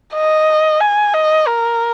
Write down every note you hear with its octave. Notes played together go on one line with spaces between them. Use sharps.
D#5
G#5
D#5
A#4